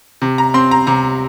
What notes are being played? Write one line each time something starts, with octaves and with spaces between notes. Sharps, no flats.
C3
A#5
C4 C6
A#5
C3 A#5